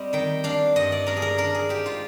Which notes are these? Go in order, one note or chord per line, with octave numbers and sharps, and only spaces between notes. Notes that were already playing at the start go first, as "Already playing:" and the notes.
Already playing: G3 C4 G4 D#5
D#3 G5
D4 F5
G2 D#5
D5
D4 A#4
G#4
A#4
D4 A#4
G#4
G#2 G4
F4